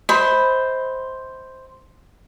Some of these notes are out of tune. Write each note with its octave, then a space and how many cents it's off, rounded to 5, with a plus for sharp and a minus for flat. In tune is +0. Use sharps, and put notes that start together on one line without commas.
C5 +0 D#5 +40 B5 +5